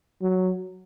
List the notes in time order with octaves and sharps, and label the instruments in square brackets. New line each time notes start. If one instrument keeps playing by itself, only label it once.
[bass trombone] F#3